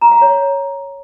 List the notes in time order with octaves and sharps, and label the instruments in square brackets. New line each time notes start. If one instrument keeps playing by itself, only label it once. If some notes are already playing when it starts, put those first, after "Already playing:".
[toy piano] A#5
F5
C#5